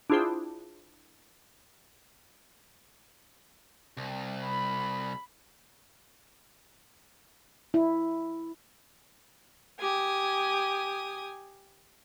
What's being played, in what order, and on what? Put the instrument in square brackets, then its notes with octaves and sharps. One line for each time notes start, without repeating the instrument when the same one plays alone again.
[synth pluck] D4 E4 F4 G#4 C5 G5
[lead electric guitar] C2
[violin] B5
[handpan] E4
[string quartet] G4 G#5 D#6